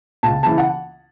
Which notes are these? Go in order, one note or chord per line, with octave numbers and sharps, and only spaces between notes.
C#2 A5
C#3 E3 A5
F#5